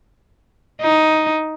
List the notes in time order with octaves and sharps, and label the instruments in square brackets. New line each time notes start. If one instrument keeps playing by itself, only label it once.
[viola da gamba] D#4